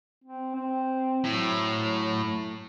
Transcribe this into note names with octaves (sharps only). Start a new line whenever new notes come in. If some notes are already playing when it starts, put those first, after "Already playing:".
C4
C4
A2 F#3